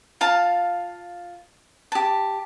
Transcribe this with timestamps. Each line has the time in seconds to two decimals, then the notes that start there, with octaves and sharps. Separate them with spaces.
0.21 F4 F5 A5
1.92 G4 A5